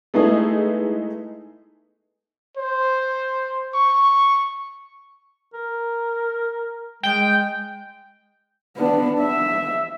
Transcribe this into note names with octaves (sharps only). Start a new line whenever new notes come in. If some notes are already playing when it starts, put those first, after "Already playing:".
G#3 A3 B3 D#4 E4 G#4
C5
C#6
A#4
G#3 G5
B3 D4
E5